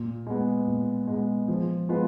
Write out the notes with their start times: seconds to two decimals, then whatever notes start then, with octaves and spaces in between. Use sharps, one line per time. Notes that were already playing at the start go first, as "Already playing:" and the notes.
Already playing: A#2
0.27 G#3 B3
0.67 A#2
1.07 G#3 B3
1.48 F3
1.89 G#3 B3 F4 B4